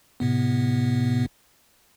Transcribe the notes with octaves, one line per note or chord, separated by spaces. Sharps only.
A2 C3 B3